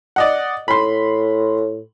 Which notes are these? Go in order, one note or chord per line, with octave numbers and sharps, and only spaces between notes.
D5 D#5 F#5
A2 B5 C6